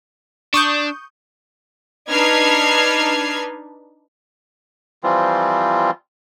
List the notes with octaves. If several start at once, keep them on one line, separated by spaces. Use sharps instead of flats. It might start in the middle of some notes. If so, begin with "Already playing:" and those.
D4 C#6 D#6 G6
D4 D#4 B4 F6 G#6 C7
E3 F3 G3 C4 F4